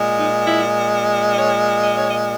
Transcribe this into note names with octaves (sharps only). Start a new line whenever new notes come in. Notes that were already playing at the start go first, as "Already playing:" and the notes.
Already playing: A#2 G#3
D#4
E4
D#5
C#5
D#5
C#5
D#5